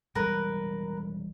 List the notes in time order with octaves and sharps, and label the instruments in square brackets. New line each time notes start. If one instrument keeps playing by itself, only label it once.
[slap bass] E1 G3 G#3 [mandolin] A#4 B4